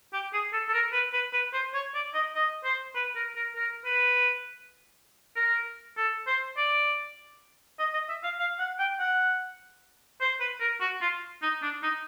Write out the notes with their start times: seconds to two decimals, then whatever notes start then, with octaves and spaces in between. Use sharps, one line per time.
0.13 G4
0.33 G#4
0.53 A4
0.69 A4
0.74 A#4
0.93 B4
1.14 B4
1.33 B4
1.54 C5
1.74 C#5
1.95 D5
2.14 D#5
2.35 D#5
2.64 C5
2.95 B4
3.16 A#4
3.36 A#4
3.56 A#4
3.85 B4
5.36 A#4
5.98 A4
6.27 C5
6.58 D5
7.79 D#5
7.93 D#5
8.09 E5
8.24 F5
8.39 F5
8.59 F#5
8.79 G5
9.00 F#5
10.21 C5
10.40 B4
10.61 A#4
10.81 F#4
11.01 F4
11.42 D#4
11.63 D4
11.83 D#4